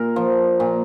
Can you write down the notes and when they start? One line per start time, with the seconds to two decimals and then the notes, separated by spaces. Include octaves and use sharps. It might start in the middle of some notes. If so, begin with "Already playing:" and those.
Already playing: A#2 A#4
0.16 F3
0.60 A#2